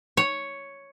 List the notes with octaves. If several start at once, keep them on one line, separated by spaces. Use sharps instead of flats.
C#5